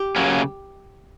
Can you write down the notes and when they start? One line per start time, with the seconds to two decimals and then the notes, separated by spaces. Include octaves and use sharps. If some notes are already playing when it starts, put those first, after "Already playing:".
Already playing: G4
0.16 C#3 F#3 A#3 C#4